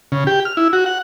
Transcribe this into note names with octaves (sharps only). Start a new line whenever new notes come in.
C#3
G4
F6
E4
F#4
F#5